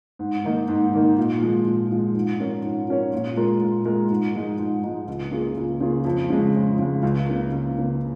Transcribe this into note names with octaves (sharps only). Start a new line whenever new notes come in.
G#2
D#3 A#3 D#4
G#2
D#3 A#3 D#4
A#2
F3 G#3
A#2
F3 G#3
G#2
F3 C#4 A#4 C#5
G#2
F3 C#4 A#4 C#5
A#2
G#3 F4 A#4
A#2
G#3 F4 A#4
G#2
F3 G#3 D#4
G#2
F3 G#3 D#4
C#2
C#3 A#3 F4 G#4
C#2
C#3 A#3 F4 G#4
F2
C#3 G#3
F2
C#3 G#3
C#2
C#3 A#3
C#2
C#3 A#3